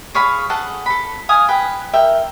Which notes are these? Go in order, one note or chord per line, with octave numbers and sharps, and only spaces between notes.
G#4 C#5 F5 B5
G#4 A4 F#5 A5
A4 B5
F5 G#5 D#6
B4 G5
A#4 E5 G5